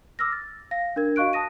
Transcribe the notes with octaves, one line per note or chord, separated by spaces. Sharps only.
D6 E6 F6 A#6
A6
F5 A#6
D4 A#4 G#6
F#4 D#5 F5 C#6 F#6 D7
A5 D#6 A#6 D#7